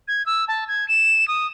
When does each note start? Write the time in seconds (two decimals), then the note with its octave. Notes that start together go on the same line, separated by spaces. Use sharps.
0.08 G#6
0.26 E6
0.48 A5
0.68 G#6
0.89 E7
1.28 D#6